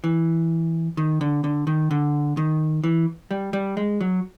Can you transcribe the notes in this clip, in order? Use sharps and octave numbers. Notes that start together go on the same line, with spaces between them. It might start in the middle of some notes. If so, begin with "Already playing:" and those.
E3
D#3
D3
D3
D#3
D3
D#3
E3
G3
G3
G#3
F#3